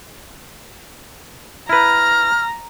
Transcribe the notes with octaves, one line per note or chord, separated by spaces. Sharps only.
E4 B4 A#5 F6